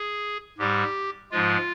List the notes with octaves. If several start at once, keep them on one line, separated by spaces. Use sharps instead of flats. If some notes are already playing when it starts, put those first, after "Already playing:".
Already playing: G#4
G#2 G3 G4
G#2 F3 G#3 F4